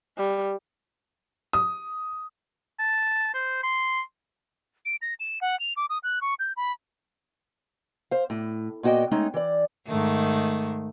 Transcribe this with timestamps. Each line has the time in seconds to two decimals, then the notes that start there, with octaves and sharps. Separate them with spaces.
0.18 G3
1.53 D#6
2.79 A5
3.34 C5
3.63 C6
4.85 D7
5.02 A#6
5.20 E7
5.41 F#5
5.60 F7
5.77 D6
5.90 D#6
6.03 F#6
6.21 C#6
6.39 G6
6.57 B5
8.11 C5 F5
8.30 A2
8.83 A#2 B3 F#4 D#5 G5
9.11 G#3 A3 C#4 D#4
9.34 E3 D5
9.87 G#2 D#3 A3